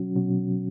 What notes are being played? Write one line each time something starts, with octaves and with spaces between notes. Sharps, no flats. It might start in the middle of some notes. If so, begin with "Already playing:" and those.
Already playing: B2 F#3 C#4 F#4
B2 F#3 C#4 F#4